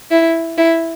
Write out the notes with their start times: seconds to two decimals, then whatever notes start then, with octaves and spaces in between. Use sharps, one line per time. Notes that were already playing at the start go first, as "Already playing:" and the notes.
0.11 E4
0.58 E4